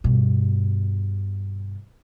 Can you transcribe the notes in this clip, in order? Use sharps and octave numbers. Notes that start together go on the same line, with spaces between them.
G2 B2